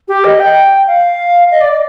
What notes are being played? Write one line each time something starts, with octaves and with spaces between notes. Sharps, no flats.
G4
D#5
G5
F5
D#5
D5
D5